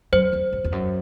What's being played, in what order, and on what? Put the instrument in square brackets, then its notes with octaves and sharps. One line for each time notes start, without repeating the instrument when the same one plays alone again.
[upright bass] F#2 [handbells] C5
[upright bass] E2
F#2
E2
F#2